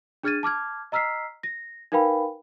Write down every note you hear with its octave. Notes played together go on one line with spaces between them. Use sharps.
D4 G#4 F6 G#6 A6 D#7
A5 D6 F6 G#6
D#5 A#5 E6 F6 B6 C7
A#6
D#4 A#4 B4 F5 G5 B5